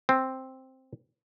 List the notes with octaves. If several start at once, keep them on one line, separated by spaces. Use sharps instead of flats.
C4